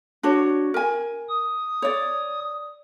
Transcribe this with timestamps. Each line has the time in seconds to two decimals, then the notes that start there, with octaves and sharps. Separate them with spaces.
0.23 D4 F#4 C#5
0.74 A#4 G#5
1.29 D#6
1.82 C#5 D5